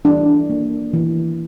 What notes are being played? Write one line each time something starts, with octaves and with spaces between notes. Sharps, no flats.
E3 D4
A#3
E3